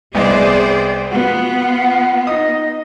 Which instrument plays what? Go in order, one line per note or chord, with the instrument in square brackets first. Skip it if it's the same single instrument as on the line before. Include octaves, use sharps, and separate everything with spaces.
[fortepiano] C2 B3 D#5 [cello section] G#4 C5 D5
[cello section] B3 F4 [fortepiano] F#4 B4 [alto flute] F#5
[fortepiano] D#4 D#6 [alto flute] D#5